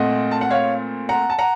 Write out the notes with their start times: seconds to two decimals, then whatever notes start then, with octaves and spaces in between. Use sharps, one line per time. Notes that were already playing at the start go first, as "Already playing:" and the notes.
Already playing: A#2 A3 C4 D#5 F#5
0.31 A5
0.41 F#5
0.50 C#5 F5
1.09 F#5 A#5
1.30 A5
1.39 F#5 A#5